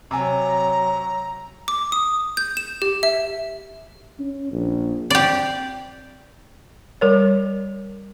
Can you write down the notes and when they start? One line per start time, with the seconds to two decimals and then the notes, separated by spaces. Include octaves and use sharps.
0.11 C3 F#3 G#5 A#5
1.68 D6
1.92 D#6
2.37 G6
2.57 E7
2.82 G4
3.03 E5
4.19 C#4
4.51 A#1
5.10 C4 G4 D5
7.01 G3 A#4 C#5